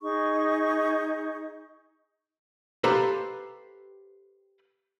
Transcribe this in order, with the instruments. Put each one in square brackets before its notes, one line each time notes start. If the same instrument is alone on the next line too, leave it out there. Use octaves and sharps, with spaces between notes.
[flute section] D#4 G#4 C#6
[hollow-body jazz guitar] G4 A4 B4 C5 F5 A#5